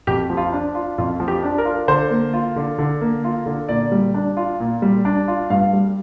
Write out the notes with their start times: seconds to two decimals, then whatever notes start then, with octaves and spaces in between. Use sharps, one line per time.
0.07 F2 G4
0.30 F3
0.37 F4
0.52 D4
0.75 F4
0.98 F2 F4
1.20 F3
1.28 G4
1.43 D4
1.58 A#4
1.65 F4
1.88 D3 C5
2.10 A#3
2.33 F4
2.56 D3
2.78 D3
3.01 A#3
3.24 F4
3.46 D3
3.69 A#2 D5
3.92 G3
4.14 D4
4.37 F4
4.60 A#2
4.82 G3
5.05 D4
5.28 F4
5.50 G2 F5
5.73 G3